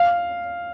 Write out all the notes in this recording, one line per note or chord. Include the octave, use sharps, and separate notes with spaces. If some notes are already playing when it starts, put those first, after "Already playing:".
Already playing: F5